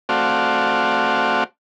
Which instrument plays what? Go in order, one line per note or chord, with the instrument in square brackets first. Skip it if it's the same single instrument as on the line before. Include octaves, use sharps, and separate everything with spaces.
[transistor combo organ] A3 C4 F#4 D5 F5